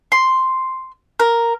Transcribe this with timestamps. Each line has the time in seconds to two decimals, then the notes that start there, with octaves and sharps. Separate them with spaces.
0.12 C6
1.20 A#4